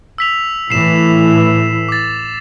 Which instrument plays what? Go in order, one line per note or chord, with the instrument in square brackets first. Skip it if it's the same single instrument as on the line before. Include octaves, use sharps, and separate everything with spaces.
[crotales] E6 B6 F7
[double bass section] A2 E3 [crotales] C7 E7
[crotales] D6 A6